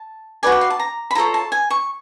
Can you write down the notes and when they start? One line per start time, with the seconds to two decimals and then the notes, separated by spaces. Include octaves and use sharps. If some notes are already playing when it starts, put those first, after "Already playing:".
Already playing: A5
0.43 F#4 B4 D5 G#5
0.52 G5
0.61 F5
0.70 A5
0.80 A#5
1.11 B5
1.15 F4 A4 C#5 A#5
1.34 A5
1.52 G#5
1.70 C#6